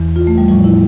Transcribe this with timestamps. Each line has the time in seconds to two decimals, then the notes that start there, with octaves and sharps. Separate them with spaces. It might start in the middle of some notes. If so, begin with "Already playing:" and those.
Already playing: E2 E3
0.16 F4
0.27 A3
0.38 G3
0.48 A2 F3 G3
0.64 E4